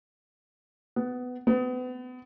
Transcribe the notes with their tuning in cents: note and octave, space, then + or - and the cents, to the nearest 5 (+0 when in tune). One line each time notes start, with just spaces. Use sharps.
B3 +15
B3 +35